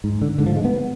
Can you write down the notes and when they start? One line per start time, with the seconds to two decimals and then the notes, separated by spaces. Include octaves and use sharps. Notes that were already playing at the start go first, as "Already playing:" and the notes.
0.04 G#2
0.22 D3
0.38 G#2 D3
0.46 F3
0.56 G#3
0.64 B3